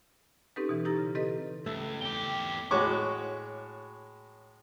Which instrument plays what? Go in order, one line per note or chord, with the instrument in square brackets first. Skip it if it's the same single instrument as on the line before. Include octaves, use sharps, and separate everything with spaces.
[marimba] C4 C#4 D#4 G4 A4 B4
B2 E3
D#4 E4 G4 A#5 A6 A#6
C#3
C4 G4 A4 B4 D#5
[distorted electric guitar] C#2 [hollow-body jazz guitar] A3
[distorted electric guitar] E2 G4 [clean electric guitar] C4 G5
[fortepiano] A2 G#3 F#4 C#5 C#6 D6